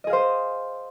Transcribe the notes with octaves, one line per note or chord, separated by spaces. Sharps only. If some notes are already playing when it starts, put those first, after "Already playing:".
G#4 C5 D#5 F5